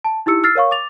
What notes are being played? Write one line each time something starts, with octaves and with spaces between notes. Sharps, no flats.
A5
D#4 E4 G4 E6 C#7
E6 F6 A6 C7
A#4 C#5 F5 C#6
D6 A6 F7